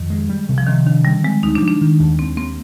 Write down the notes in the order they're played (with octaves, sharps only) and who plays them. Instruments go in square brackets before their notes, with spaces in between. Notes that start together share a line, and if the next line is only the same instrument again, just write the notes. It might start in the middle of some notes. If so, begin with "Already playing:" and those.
Already playing: [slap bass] F2 [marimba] D#3
[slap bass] G#3
G3
C3
[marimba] F3
[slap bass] C3 [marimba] D#3
[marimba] D#3 [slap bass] D4
[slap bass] D3 [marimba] G3
[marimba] G#3 [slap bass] C4
[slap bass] D2 [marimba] D#4
[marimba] D4
[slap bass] F3
[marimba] D4
[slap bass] D#3
D#2
[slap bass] D#2 [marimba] C4
[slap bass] A#3 [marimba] C4